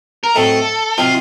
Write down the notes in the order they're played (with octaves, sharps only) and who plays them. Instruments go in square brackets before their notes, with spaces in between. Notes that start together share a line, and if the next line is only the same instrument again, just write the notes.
[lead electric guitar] A#4
[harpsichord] A2 F#3 A3 C4 D#4 [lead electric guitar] A4
[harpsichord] C3 F#3 C4 D#4 [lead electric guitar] F4